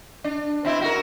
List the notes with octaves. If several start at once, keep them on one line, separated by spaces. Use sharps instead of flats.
D4
B2 C4 E4
F#4 A#4